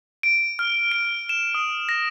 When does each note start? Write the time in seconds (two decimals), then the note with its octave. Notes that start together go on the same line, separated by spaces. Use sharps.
0.23 D7
0.59 F6
0.92 D7
1.29 E7
1.55 D#6
1.89 A#6